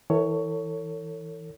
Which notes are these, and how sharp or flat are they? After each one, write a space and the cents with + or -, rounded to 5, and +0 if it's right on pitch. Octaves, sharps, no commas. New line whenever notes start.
E3 -20 A4 +35 C#5 +5